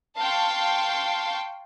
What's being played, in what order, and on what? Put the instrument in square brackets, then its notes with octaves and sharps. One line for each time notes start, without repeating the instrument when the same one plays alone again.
[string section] F5 G5 A5 C6 C#6